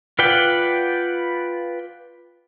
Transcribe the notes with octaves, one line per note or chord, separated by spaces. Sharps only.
F4 B4 D5 F#5 G5